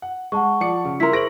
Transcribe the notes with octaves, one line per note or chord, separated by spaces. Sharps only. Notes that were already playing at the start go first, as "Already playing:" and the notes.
F#5
G#3 F#5 A5 C#6
F3 D5 C#7
C#3 F4
E4 A#4 C6 B6
G#4 C5 C#6 A#6 D7 F#7